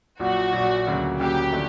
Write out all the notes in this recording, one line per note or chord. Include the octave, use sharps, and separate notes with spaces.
A#1 A#2 F#3 F#4
A#1 A#2 F#3
D2 C#3 F#3 A#3
D2 C#3 F#3 A#3 G4
D3 F3 A3